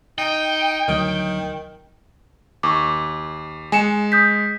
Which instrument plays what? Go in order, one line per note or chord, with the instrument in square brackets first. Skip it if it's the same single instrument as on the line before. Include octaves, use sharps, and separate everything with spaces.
[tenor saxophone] D#4 [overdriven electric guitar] G5
[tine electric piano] D2 F#3 D#6 [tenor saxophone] D#3
[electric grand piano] D#2 [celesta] C#6 D6
[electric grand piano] G#3 C#7 [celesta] G#5 E7
[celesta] D#6 G6 B6